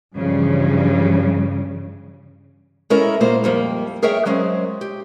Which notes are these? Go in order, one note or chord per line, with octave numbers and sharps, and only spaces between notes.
G2 C#3 E3 F3 G3
G#3 C#4 E4 A4 A#4
A#2 G#3 A#3 C5
F2 G3 A#3
G#4 A#4 C#5 E5 G5
F#3 G#3 C4 C#4
G4